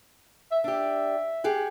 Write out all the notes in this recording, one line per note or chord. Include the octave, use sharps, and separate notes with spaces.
E5
D4 G4 E5
G4 G#4 F#5